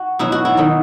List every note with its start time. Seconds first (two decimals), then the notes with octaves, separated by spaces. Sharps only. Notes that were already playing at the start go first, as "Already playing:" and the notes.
Already playing: F#4
0.19 B2 F#3 E4
0.32 F#4
0.45 E4
0.57 D#3 F#3